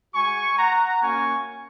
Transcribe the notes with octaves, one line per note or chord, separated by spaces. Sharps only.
G#3 F#4 G#5 C#6
F#5 A#5
A#3 C#4 F#4 G#5 C#6